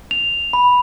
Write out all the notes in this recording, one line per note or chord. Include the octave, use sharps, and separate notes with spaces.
F7
B5